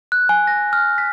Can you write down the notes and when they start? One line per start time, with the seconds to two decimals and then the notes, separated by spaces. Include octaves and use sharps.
0.12 F#6
0.29 G#5
0.47 A#6
0.73 F6
0.98 B6